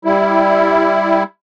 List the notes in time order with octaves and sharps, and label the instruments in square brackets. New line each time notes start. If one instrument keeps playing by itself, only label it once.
[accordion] G3 E4